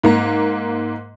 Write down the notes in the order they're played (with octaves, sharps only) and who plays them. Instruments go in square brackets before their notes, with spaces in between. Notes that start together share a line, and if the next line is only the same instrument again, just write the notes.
[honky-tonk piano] G#2 A#3 A#5